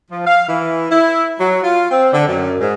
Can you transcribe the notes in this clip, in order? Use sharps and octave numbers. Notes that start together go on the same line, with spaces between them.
F3
F5
E3
E4
F#3
F4
C4
D3
F#2
G#2